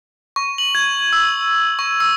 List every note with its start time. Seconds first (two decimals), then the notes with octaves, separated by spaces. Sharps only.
0.36 C#6
0.58 F#7
0.75 G#6
1.13 E6
1.79 C#6
2.00 E6